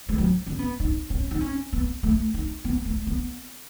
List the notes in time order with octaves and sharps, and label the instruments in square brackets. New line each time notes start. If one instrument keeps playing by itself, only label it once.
[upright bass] G#3
F#3
C#4
B3
D#4
C#4
D#4
C#4
B3
A3
D#4
B3
A3
B3